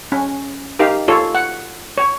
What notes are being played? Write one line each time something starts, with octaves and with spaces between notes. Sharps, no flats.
C#4
D#4 G4 A#4 F5
F4 A4 C#5
F#5
C#5